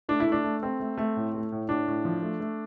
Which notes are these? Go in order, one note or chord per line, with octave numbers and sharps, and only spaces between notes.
A3 D4
E4
A3 D4
A3
A3 C4
A3
A3
A2
A3
A2
A2 D4
A2
F3
A3
A3